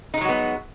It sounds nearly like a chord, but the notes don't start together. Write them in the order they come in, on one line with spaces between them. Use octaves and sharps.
D#4 G#3 F#3 F#4 B3